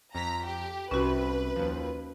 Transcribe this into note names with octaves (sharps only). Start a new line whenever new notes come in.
F2 A#5 B6
G4
C2 C3 C#4 F#4 B4
D#2 F3